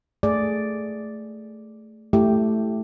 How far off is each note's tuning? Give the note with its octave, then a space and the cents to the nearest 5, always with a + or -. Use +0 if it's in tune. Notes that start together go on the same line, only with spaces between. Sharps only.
A3 +0 G#4 +0 D5 +0
A3 +0 E4 +15 G4 +0